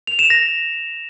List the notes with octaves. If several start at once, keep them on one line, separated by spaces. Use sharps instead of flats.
F7
E7
A#6